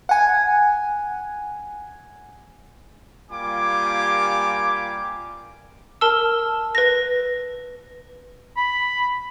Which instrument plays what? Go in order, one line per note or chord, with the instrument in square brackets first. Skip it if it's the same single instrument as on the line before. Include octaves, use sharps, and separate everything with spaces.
[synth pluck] F#5 G#5
[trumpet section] G3 A#3 F4 G4 G#5 D6
[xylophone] A#4 A5 E6
B4 A#6
[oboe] B5